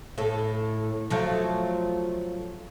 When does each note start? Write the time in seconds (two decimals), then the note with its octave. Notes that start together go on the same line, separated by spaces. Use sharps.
0.18 A2 A4
1.10 F3 F#3 A3